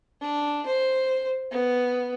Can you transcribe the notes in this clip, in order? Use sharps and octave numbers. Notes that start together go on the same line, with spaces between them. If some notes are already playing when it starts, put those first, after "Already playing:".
D4
C5
B3